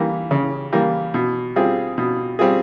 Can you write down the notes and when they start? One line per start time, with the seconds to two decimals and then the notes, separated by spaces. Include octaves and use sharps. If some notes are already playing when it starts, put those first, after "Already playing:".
Already playing: E3 G3 A#3
0.31 C#3
0.72 E3 G3 A#3
1.14 B2
1.56 G3 C4 F4 G#4
1.98 B2
2.39 G3 C4 F4 G#4